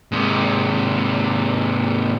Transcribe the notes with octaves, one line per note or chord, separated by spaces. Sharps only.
G#2 C3